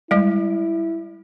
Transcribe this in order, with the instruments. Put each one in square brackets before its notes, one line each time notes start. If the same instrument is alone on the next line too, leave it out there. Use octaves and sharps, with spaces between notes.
[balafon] G3 G#3 [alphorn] E4